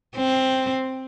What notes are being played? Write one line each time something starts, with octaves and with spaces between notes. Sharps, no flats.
C4